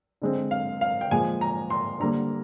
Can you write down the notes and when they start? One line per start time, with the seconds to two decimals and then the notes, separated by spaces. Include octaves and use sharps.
0.22 D3 G#3 C4
0.51 F5
0.81 F5
1.01 G5
1.11 A#2 F3 G#3 G#5
1.41 A#5
1.70 C6
2.00 D3 G3 A#3 A#5